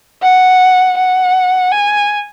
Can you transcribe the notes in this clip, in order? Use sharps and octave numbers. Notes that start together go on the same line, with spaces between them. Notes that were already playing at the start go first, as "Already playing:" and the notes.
F#5
F#5
G#5